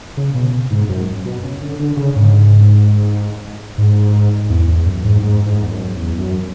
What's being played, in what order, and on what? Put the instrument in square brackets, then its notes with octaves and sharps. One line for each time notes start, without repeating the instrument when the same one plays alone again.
[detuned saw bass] C#3
B2
G#2
F#2
B2
C#3
D3
D3
C#3
G#2
G#2
E2
E2
F#2
G#2
G#2
G#2
E2
F#2
E2
F#2